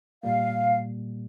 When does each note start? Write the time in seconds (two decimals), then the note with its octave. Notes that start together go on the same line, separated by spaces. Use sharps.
0.23 A#2 G3 A#3 F5